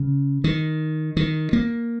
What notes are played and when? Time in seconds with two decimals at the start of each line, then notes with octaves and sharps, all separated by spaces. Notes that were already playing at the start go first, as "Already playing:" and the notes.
Already playing: C#3
0.44 D#3
1.17 D#3
1.53 A#3